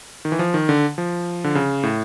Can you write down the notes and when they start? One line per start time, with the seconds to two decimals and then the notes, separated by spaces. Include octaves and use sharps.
0.25 D#3
0.32 E3
0.39 F3
0.54 D#3
0.69 D3
0.98 F3
1.44 D3
1.55 C#3
1.83 A2